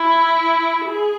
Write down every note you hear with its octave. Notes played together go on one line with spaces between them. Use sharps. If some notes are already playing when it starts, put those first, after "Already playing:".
Already playing: E4
G#4